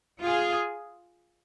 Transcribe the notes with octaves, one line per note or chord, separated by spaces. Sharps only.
F4 G#4